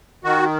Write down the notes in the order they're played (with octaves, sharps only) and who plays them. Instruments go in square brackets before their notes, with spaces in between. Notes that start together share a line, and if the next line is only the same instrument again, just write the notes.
[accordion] D#3 F#4